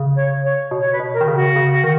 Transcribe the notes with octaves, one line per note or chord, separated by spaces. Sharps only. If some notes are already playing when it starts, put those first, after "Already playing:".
Already playing: C#3
C#5
C#5
B2
C#5
B4
B2
A#4
D#3
C#3
F#4
C#3
D#3